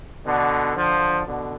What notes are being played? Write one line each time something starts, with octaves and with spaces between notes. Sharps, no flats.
B2 D3
D3 F3
B2 D3